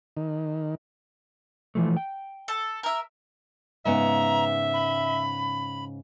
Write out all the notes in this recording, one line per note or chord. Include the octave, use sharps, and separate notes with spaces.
D#3
E3 F3 A3
G5
A4
A#4 E5
G#2 C#3 B3 E5 A#5
B5